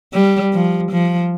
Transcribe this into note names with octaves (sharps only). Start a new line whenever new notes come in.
G3
F3
F3